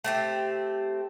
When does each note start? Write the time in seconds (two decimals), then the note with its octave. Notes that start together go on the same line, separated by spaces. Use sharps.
0.04 A3 C4 G4